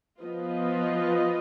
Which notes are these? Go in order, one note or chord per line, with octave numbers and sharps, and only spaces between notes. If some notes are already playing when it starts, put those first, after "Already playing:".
F3 B3 F4 B4 D#5